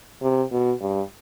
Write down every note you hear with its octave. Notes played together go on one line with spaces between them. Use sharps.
C3
B2
G2